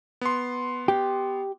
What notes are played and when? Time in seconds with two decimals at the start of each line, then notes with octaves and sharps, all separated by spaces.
0.21 B3 C6
0.88 G4